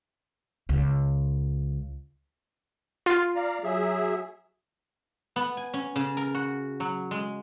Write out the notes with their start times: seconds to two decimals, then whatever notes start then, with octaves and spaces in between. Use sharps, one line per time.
0.69 C#2
3.06 F4
3.36 D5 F5 A#5
3.64 F#3 G#4 E5
5.36 B3
5.57 G#5
5.73 C#4
5.96 C#3
6.17 A#4
6.35 F#4
6.80 F#3
7.11 G#3